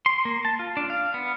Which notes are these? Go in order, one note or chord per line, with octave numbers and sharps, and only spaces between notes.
C6
A#3
A5
F4
D4
F5
B3